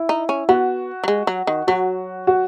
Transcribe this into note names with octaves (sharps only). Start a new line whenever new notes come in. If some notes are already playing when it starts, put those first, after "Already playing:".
Already playing: E4
D#4
C#4
B3 F#4
F#3
G#3
F#3
D#3
F#3 F#4
F#4